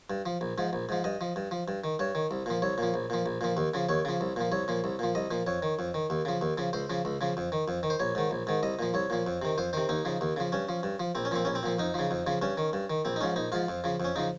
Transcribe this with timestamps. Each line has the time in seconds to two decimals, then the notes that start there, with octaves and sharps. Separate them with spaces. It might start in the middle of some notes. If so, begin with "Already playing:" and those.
0.10 G2
0.26 F3
0.41 A#1
0.58 G#2 F3
0.73 A#1
0.89 G#2 F3
1.04 G2 D#5
1.21 F3
1.36 G2
1.51 F3
1.68 G2
1.84 D#3
1.99 G2 C#5
2.15 D#3
2.31 C2
2.46 A#2 F3
2.62 C2 C#5
2.78 A#2 F3
2.94 A#1
3.10 A#2 F3
3.26 A#1
3.41 A#2 F3
3.57 D#2
3.74 C#3 F3
3.89 D#2 C#5
4.05 C#3 F3
4.21 C2
4.36 A#2 F3
4.52 C2 C#5
4.68 A#2 F3
4.84 C2
4.99 A#2 F3
5.15 C2 D#5
5.31 A#2 F3
5.47 F2 C#5
5.63 D#3
5.79 F2
5.94 D#3
6.10 D#2
6.25 C#3 F3
6.41 D#2
6.58 C#3 F3
6.73 C#2 C5
6.90 C#3 F3
7.05 C#2
7.21 C#3 F3
7.37 F2
7.52 D#3
7.68 F2
7.83 D#3
7.90 C5
8.00 A#1 C#5
8.15 G#2 D#3
8.31 A#1
8.47 G#2 D#3
8.63 C2 D#5
8.79 A#2 F3
8.94 C2 C#5
9.10 A#2 F3
9.27 F2
9.42 C3 D#3
9.58 F2 C5
9.73 C3 D#3 C5
9.89 D#2 D#4
10.05 C#3 F3
10.21 D#2
10.36 C#3 F3
10.52 G2 C#4
10.69 F3
10.83 G2
11.00 F3
11.15 A#1 C4
11.25 C#4
11.31 A#2 F3 C4
11.45 A#1 C#4
11.55 C4
11.63 A#2 F3
11.79 F2 D#4
11.94 C#3 F3
12.11 F2
12.27 C#3 F3
12.42 G2 C#4
12.58 D#3
12.73 G2
12.90 D#3
13.05 A#1 C4
13.16 D#4
13.21 G#2 F3 C#4
13.36 A#1 D#4
13.52 G#2 F3 F4
13.69 F2
13.84 C#3 F3
14.00 F2 C#4
14.16 C#3 F3 D#4